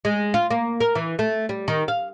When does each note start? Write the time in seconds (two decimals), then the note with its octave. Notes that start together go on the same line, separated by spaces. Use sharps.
0.05 G#3
0.34 F4
0.50 A#3
0.80 A#4
0.95 E3
1.19 A3
1.49 G3
1.68 D#3
1.88 F5